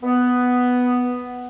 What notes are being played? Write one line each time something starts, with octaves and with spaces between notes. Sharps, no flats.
B3